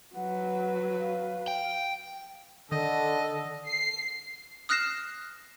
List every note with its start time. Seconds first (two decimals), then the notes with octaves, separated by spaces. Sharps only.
0.15 F#3 B4 F#5
1.00 F5
1.48 G5
2.72 D3 D#3 A4 D#5
3.67 C7
4.69 D#6 F6 F#6 A#6 C7 E7